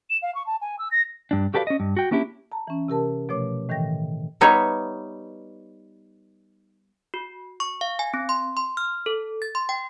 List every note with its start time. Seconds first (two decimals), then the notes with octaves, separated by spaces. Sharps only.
0.10 E7
0.22 F5
0.35 C#6
0.47 A5
0.61 G#5
0.79 E6
0.91 A#6
1.31 G2 D4
1.54 F#4 G4 A4 B4 D5 F5
1.67 C#4 D#5
1.80 G2
1.97 F#4 G5
2.11 A#3 C#4 D4 E4 G4
2.52 A5 A#5
2.67 E3 C#4
2.88 C3 G4 A#4 A5
3.29 B2 F3 A3 C#5 D6
3.69 A2 D#3 E3 G5 A#6
4.41 G3 B3 D#4 C#5 E5
7.14 F#4
7.60 C#6
7.81 F5
7.99 G#5
8.14 C4
8.29 C6
8.57 C6
8.77 F6
9.06 A4
9.42 A6
9.55 C6
9.69 G5